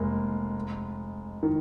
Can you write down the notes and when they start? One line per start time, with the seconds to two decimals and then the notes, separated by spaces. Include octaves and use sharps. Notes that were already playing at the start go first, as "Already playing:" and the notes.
Already playing: F1 G#3 A#3
1.43 D#3